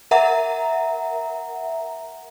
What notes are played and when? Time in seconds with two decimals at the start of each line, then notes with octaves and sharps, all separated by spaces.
0.11 A#4 E5 F#5 A#5